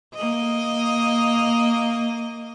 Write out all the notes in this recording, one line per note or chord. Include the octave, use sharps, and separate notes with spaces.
A#3 D#5